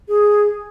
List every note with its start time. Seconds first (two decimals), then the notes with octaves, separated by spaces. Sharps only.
0.08 G#4